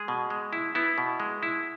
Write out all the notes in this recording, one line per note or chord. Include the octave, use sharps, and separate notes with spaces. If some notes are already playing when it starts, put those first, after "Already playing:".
Already playing: G#3 G#4
B2
G#3
E4
B3 E4
B2
G#3
E4